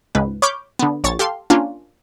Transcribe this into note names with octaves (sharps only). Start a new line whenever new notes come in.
C#2 G#2 B4
C#5 B5 C#6 D6 F6 G6
D3 B3
A#1 C#5 C#6 A6
G4 A4 F5 C6
A#3 C#4 D4 F4